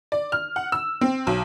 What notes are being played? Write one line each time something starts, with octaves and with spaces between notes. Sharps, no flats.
D5
F6
F#5
E6
C4
B1